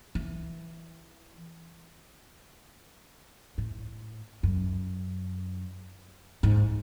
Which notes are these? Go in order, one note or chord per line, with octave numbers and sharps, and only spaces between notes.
E3
A2
F#2
G#2